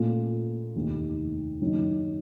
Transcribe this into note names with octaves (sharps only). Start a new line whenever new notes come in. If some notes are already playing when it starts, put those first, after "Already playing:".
Already playing: A#2 A3 C#4 F4
F1 D#2 D#3
F#1 F#2 D#3